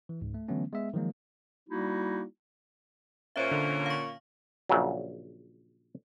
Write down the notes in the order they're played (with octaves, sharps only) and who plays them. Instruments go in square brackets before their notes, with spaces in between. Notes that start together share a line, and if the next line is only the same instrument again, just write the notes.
[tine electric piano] E3
C#2 G#2
A3
D3 E3 F#3 A3 B3 C#4
G#3 B3 E5
D#3 F3 F#3 G#3 A#3
[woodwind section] G3 A#3 D#4 E4 F#4
[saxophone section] A#2 A#3 C#4 [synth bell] C5 C#5 E5
[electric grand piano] D3
[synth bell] F5 C#6
[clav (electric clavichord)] A#1 C#3 F#3